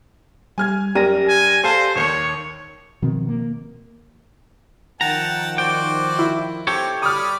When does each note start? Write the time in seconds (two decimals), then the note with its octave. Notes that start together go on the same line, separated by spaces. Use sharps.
0.58 G3 G#5 F6 G#6
0.95 F#2 G4 A#4 D5 A#6 D#7
1.28 G#5
1.64 A4 C5 F5 A5
1.96 D#2 D#3 C#5 C#7
3.02 B2 D#3 F3 C4
3.29 A#3
5.01 D#3 F3 F#5 G5 A5 A#5
5.58 F#4 C5 D5 G5
6.19 E4
6.67 C4 G4 A4 C#5
7.02 G3 D5 B5 D#6 F6